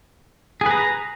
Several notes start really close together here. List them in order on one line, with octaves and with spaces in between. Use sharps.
G#4 B4 A#5